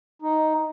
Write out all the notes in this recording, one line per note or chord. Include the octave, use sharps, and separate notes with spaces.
D#4